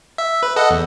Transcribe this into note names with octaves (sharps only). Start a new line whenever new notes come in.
E5
B4
A4 D#5 F#5
E2